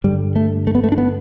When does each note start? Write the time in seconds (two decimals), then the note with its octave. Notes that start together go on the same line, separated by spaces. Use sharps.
0.04 G2 D3 G3
0.36 A3
0.67 A3
0.75 B3
0.84 A3
0.92 D4
0.98 B3